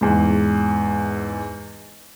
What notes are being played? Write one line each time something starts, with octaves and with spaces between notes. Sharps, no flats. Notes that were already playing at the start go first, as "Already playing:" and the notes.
E2 G#2